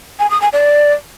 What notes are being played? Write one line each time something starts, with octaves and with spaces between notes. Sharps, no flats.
G#5
D#6
G#5
D5